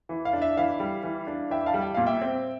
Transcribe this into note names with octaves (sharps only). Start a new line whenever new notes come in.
E3
F5
D4
E5
E3 F5
G3
E3
D4
E3 E5 G5
F5 A5
G3
G5
A#2 F5
E5 G5
C4